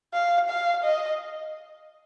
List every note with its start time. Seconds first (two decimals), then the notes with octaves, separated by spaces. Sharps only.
0.14 F5
0.50 F5
0.84 D#5